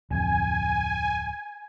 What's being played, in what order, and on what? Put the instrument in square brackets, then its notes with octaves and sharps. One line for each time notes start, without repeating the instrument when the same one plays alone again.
[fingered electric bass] D1 F2 [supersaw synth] G#5